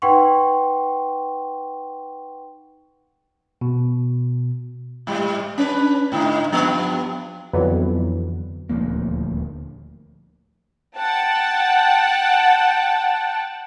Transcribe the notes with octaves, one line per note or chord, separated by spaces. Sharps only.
D#4 B4 F#5 G5 C6 C#6
B2
G#2 G3
C#4 D4 B4
G#2 D3 D#4
G2 F3 B3
F2 D3 E3 F#3 B3
D#1 D2 F3 A#3
F#5 G5 A5